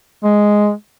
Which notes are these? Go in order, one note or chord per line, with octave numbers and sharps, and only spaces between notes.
G#3